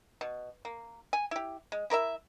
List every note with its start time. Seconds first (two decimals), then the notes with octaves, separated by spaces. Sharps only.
0.21 B2
0.65 A#3
1.13 G#5
1.31 E4 G4
1.72 G#3
1.90 E4 A#4 C#5 E5